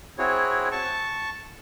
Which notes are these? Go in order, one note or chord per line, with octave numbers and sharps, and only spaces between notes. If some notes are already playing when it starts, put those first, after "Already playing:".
C4 E4 F#4 G#4 C#5
A5 C#6